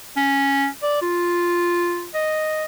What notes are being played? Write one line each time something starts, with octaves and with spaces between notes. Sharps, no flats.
C#4
D5
F4
D#5